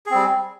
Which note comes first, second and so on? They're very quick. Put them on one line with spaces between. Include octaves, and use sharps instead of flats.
G#4 C4 G3